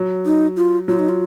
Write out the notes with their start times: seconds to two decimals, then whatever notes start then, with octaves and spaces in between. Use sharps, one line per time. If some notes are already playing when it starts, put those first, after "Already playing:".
Already playing: F#3
0.25 D#4
0.57 F4
0.88 F#3 F4
0.99 D#4
1.09 F4